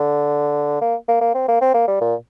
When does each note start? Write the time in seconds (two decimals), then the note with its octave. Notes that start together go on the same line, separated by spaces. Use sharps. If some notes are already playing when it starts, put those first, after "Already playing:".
Already playing: D3
0.81 A#3
1.08 A#3
1.21 A#3
1.34 C4
1.48 A#3
1.61 C4
1.74 A#3
1.88 G3
2.01 A#2